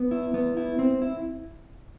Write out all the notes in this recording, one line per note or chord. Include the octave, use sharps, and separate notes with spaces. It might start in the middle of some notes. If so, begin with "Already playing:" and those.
Already playing: B3
E4
B3
E4
C4
E4